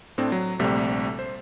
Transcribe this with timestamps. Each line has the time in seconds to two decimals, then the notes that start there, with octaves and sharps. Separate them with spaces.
0.18 A2 C4 D4
0.32 F#3
0.59 A#1 C3 G3 A3
1.19 C5